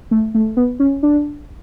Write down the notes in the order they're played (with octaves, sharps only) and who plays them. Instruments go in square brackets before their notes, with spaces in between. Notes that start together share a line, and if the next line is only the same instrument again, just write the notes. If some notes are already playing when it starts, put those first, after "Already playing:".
[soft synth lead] A3
A3
B3
C#4
D4